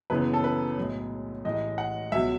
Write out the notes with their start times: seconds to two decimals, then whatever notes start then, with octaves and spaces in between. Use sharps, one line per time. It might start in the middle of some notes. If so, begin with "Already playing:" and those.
0.10 F#1 F#2 C#3 E3 B3 B4
0.34 A4
0.44 B4
0.77 B1 A2 G#3
1.45 A1 A2 E3 G#3 D#5
1.78 F#5
2.12 C#2 B2 F#3 E5